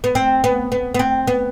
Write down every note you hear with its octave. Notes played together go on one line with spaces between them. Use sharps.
B3
C4
B3
B3
B3
C4
B3